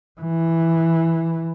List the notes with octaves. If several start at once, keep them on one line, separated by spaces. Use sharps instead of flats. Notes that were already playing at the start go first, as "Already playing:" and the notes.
E3